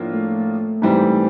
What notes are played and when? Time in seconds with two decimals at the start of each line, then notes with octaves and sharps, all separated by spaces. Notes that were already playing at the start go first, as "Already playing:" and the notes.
Already playing: A2 F3 A#3 D4 F4
0.13 A3
0.82 G#2 E3 G3 C4